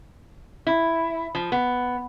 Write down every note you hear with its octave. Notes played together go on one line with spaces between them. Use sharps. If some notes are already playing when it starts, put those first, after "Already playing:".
E4
F3
B3